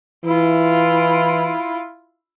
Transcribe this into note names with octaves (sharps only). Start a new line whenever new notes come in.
E3 E4 F4